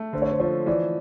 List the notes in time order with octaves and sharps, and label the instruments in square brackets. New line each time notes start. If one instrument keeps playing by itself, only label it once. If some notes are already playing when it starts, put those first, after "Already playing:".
Already playing: [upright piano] A3
[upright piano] D3 [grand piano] C5
[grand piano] C#5
C5
[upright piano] F3 [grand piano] C#5
[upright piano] E3 [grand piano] D5